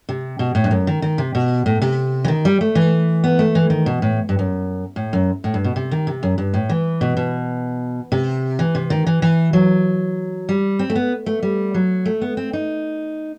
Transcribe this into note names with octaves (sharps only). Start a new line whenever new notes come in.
C3
B2
A2
G2
F#2
D#3
D#3
C3
B2
A2
C3
E3
D#3
G3
A3
E3
B3
A3
E3
D#3
B2
A2
G2
F#2
A2
F#2
A2
G2
B2
C3
D#3
C3
F#2
G2
A2
E3
B2
B2
C3
E3
C3
D#3
E3
E3
F#3
G3
C4
A3
B3
A3
G3
F#3
A3
B3
C4
D#4